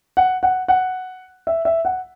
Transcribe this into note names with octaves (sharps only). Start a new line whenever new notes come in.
F#5
F#5
F#5
E5
E5
F#5